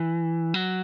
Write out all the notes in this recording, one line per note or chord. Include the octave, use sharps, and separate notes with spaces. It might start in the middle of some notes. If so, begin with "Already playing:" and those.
Already playing: E3
F#3